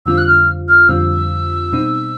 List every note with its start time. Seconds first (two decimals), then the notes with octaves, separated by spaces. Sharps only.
0.06 F2 D3 G3 C4 F4 E6
0.18 F#6
0.27 F6
0.68 F6
0.89 F2 D3 G3 C4 F4 E6
1.72 B2 G3 C4 D#4